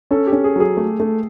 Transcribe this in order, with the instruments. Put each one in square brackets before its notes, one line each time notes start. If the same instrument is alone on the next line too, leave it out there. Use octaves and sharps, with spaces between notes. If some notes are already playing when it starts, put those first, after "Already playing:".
[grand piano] C#4 [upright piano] A4
[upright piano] G4
[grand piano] C#4
[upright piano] G#4
[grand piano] F#3 [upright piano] G#4
[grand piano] A3
A3